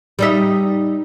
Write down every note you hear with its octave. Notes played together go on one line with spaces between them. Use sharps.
G3 D#4 E5